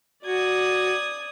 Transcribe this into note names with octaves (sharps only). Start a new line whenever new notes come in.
F#4 D5 D#6 G#6